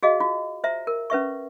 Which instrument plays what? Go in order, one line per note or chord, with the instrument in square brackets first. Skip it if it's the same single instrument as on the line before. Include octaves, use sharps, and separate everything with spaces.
[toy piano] F#4 G#4 D#5 F5
F4
C5 E5 A#5
A#4
C#4 B4 E5 C#6